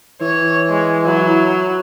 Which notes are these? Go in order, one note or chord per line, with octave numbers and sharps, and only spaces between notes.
E3 C#5
G#3
F#3 E4